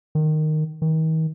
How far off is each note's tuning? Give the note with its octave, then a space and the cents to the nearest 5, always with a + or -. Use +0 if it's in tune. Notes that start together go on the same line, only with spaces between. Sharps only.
D#3 -10
D#3 +40